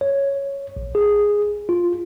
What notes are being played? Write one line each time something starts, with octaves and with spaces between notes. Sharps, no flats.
C#5
A#1
G#4
F4